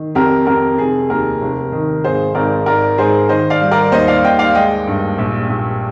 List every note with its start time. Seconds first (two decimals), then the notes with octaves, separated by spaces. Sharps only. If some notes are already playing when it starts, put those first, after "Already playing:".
Already playing: D#3
0.15 F2 G4 A#4
0.47 F2 G4 A#4
0.78 F1 G#4
1.10 D#2 G4 A#4
1.41 F1
1.72 D#3
2.04 G#1 G#4 C5
2.35 G#1 A#4 D5
2.66 G#2 A#4 D5
2.98 G#2 G#4 C5
3.29 D#3 C5 D#5
3.50 D5 F5
3.61 G3
3.71 A#4 D5
3.92 D#2 C5 D#5
4.08 D5 F5
4.24 D#2 D#5 G5
4.39 D5 F5
4.55 G#3 D#5 G5
4.87 G2
5.18 A#1
5.49 A#1